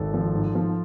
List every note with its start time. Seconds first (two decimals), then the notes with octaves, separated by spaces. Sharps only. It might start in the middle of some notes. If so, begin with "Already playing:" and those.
Already playing: G#1 A4
0.14 F3
0.35 G#2
0.55 F3